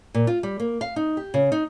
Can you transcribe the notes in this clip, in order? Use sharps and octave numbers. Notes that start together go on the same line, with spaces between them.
A#2
F4
G3
A#3
F5
D#4
G4
C#3
D#4